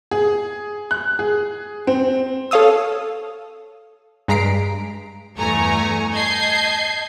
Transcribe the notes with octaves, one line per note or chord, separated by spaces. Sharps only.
G#4
F#6
G#4
C4
A4 C#5 F5 D#6 E6
G2 G#3 A#5 B6 C7 D7
E2 G2 A3 G#5 A#5 C#6
D#5 A5 G6 G#6 C7